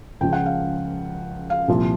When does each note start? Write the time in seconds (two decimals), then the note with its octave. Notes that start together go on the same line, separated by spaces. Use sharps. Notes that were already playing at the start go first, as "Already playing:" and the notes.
0.21 C#2 C#3 F3 G5
0.33 F#5
0.46 F5
1.50 F5
1.68 C2 A#2 F3